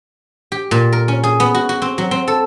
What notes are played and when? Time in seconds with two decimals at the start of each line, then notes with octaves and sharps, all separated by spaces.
0.52 G4
0.71 A#2
0.93 A#4
1.08 C#4
1.23 G#4
1.40 B3
1.55 F#4
1.69 F#4
1.82 C4
1.98 F#3
2.11 C4
2.28 A4